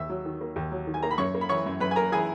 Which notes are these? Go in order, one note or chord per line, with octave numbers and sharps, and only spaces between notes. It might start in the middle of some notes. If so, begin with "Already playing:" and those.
Already playing: D#2 E5 E6
F#3
D#3
A#3
D#2
F#3
D#3
G#5
A#3 A#5
B5
F#2 C#5 C#6
A#3
B5
E3 C#5 C#6
F#2
F#2 B4 B5
G#5
A#3 A#4 A#5
E3 G#4 G#5